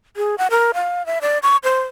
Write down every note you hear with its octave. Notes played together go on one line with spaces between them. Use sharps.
G#4
F#5
A#4
F5
E5
D5
C#6
C5